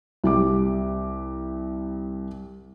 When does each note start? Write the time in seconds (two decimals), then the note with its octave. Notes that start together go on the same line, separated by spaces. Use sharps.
0.24 C2 G4 D6